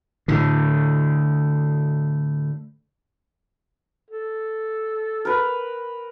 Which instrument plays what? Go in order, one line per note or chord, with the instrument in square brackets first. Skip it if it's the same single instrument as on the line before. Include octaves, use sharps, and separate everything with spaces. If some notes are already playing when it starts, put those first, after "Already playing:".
[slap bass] A2 D3
[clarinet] A4
[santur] A#4 B4